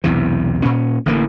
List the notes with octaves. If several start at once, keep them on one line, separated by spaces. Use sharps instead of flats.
B1 E2 C3 E3
A#2 C#4
A1 D3 E3 A#3